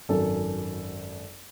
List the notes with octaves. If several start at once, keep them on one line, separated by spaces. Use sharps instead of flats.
G#1 F#2 A4